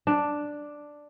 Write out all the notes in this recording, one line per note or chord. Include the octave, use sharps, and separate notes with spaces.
D4